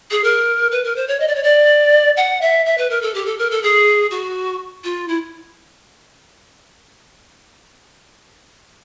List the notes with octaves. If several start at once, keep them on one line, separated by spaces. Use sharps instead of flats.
G#4
A#4
B4
A#4
C5
C#5
D#5
D5
C#5
D5
F#5
E5
E5
B4
A#4
A4
G4
A4
A#4
A4
G#4
F#4
F4
E4